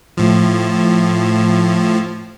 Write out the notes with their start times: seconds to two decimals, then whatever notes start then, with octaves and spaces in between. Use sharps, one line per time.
0.17 A2 F3